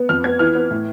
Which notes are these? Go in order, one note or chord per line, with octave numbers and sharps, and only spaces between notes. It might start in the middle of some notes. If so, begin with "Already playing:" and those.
Already playing: B3
F2 F6
B3 G#6
E3 F6
B3
A2